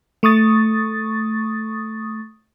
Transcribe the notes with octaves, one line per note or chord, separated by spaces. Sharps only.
A3 C#6 D#6 A6